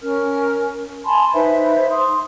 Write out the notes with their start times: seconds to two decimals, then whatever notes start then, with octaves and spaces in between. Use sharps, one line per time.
0.01 C#4 A#4 F6
1.05 G#5 A5 B5 C6
1.33 D#4 B4 C5 E5
1.89 C6 D#6